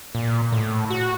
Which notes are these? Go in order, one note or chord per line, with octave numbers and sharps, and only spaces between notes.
A#2
A2
F#4